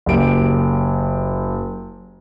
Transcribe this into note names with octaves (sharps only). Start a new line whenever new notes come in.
F#1 G4 D7